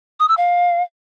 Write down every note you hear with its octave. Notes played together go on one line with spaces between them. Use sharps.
D#6
E6
F5